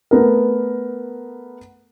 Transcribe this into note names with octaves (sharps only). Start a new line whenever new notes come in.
A3 B3 A#4